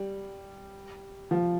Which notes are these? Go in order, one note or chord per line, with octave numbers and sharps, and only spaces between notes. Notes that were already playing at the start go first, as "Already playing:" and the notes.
Already playing: G3
F3